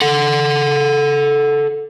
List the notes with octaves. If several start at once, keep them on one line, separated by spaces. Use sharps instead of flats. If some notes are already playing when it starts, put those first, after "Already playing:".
A4 F#5